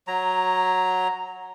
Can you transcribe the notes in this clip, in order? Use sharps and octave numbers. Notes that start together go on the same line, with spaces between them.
F#3 A#5